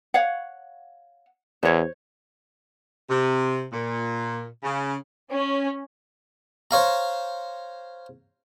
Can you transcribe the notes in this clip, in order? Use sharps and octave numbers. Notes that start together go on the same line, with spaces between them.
C#5 F5 F#5
E2 C5 C#5
C3
A#2
C#3
C#4
C5 C#5 F5 A#5